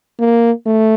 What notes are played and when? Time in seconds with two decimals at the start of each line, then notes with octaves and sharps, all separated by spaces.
0.19 A#3
0.66 A3